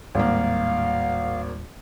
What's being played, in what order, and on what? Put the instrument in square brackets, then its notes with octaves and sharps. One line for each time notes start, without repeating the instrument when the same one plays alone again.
[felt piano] G#1 A#3 [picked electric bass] D#2 A2 G3 [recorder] F5